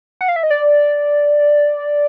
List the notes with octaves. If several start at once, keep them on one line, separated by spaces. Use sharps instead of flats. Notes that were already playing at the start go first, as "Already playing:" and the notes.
F#5
F5
E5
D#5
D5